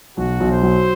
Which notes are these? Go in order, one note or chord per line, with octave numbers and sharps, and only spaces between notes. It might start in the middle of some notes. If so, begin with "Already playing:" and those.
B1 F#4
B1
C5
F#3